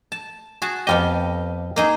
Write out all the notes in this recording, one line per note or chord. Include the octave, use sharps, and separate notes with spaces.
A5
F#4 G#4 A5
F2 B3 F4 G4 D#5
A#3 D#4 G#4